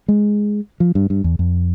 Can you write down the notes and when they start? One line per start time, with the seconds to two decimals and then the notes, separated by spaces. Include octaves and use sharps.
0.08 G#3
0.80 F3
0.95 G2
1.10 G2
1.24 E2
1.39 F2